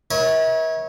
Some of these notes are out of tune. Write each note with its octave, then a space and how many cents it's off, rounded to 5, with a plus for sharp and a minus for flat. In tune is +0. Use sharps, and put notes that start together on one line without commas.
A#4 +45 C#5 -10 E5 -45